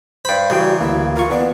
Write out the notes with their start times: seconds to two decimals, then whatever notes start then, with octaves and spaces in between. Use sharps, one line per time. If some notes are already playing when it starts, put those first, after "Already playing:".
0.25 G2 C5 G5 B5
0.50 A1 C#3 G3 F#4 G5
0.81 D2 A#3 E4
1.16 F4 A#4 C#6
1.30 E3 B3 D5